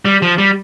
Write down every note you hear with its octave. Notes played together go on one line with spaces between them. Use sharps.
G3
F3
G3